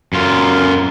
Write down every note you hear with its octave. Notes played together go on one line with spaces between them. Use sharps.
F#2 F4